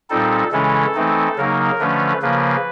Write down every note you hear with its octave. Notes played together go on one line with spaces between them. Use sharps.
A#2 G3 C4 D#4 A4
C#3 E3 G#3 C#4 E4 A4
E3 A3 C4 D#4
C#3 F#3 A#3 D#4 A#4
D3 F3 A3 C#4 B4
C#3 F3 A#3 B4